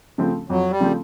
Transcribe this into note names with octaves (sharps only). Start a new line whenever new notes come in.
C#3 F3 A3 C4
F2 F#3
G3
C#3 F3 A3 C4